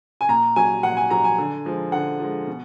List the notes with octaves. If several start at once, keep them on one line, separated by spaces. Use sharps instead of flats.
G#5
A#2 A#5
F#3 G#5
A#2 F#5
G#5
F#3 A#5
G#5
D3
F3 G#3
D3 F#5
F3 G#3
B2